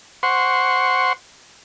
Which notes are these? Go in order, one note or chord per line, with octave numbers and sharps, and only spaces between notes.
C5 F#5 C6 C#6